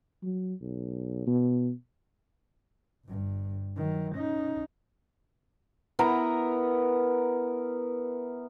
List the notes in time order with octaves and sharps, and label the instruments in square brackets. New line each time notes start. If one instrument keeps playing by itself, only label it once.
[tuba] F#3
B1
B2
[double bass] G1 G2
D#3 F#3
C#4 D#4
[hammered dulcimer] B3 E4 A#4 A#5